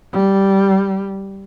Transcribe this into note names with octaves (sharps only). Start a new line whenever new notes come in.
G3